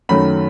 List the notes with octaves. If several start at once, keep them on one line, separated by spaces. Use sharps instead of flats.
F#2 D#3 F#3 A3 B5